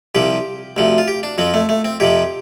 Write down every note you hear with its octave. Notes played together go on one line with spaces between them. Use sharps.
C2 C3 F3 G4
D2 C3 F3
F4
G4
D4
F2 F3 C4
A3
A3
C4
F2 C3 F3 G4